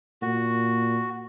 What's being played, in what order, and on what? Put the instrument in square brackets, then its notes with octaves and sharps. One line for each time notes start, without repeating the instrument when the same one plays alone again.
[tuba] A#2 [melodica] F#4